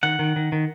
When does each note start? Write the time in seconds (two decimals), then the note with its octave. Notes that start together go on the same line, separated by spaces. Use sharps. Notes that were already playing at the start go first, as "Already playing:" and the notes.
0.03 D#3 F#5
0.19 D#3
0.36 D#3
0.52 D#3